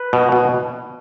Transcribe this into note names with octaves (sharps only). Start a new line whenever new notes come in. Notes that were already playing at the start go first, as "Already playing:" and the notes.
Already playing: B4
B2
B2